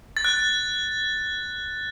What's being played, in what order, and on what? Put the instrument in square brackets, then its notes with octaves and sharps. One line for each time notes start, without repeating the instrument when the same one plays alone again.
[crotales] A6
F#6